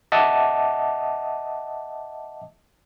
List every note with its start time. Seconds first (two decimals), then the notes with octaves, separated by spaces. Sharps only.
0.12 D#5 E5 F#5 A5 D6 D#6